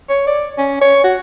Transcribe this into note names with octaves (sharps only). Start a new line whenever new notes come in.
C#5
D5
C#4
C#5
F#4